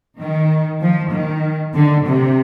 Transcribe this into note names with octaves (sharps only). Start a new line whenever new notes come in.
D#3
F3
D#3
D3
C3